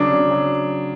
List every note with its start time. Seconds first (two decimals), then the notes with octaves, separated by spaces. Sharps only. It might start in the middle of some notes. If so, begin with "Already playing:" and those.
Already playing: C#3 F#3 D4
0.12 C#3
0.31 F#3